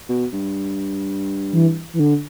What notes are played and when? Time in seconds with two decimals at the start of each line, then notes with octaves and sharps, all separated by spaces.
0.09 B2
0.33 G2
1.52 E3
1.93 E3
1.99 D3